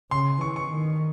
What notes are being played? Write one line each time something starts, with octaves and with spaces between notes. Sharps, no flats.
C#3 C6
E3 C#6
C#6
D#3